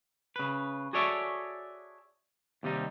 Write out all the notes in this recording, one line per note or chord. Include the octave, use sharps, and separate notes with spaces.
C#3 B4
F#4 G#4 A4 C#5 D5 E5
D#2 C3 G3 D#4